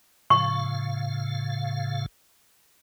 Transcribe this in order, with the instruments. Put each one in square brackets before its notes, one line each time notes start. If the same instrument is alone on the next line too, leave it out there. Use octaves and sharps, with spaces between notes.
[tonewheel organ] A2 C#3 F5 [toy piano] C#6